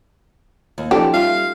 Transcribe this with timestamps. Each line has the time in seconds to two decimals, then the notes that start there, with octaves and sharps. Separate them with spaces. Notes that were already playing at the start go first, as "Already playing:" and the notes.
0.78 D#2
0.91 F3 C#4 D#4 G4 A4 D5
1.14 G3 F4 E5 F5